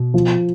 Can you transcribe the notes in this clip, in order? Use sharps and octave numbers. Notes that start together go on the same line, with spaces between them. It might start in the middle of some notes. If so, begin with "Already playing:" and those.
Already playing: B2
F3